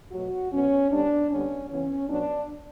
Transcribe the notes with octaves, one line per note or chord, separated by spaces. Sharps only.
B2 F#3 A3 F#4
B2 F#3 B3 C#4
A2 G3 B3 D4
D3 G3 B3 C#4
C#3 E3 B3 C#4
B2 F#3 B3 D4